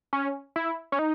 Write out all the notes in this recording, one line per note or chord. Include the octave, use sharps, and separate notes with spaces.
C#4
E4
C#4
D#4